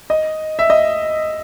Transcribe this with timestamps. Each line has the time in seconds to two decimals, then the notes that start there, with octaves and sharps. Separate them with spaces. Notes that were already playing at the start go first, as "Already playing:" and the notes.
0.10 D#5
0.59 E5
0.70 D#5